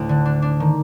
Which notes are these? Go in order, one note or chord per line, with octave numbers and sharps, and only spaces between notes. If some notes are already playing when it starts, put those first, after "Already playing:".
Already playing: D2 A2
D3
D4
D4
D#3